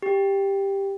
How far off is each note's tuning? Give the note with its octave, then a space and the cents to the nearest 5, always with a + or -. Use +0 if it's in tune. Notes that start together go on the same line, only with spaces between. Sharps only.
G4 +5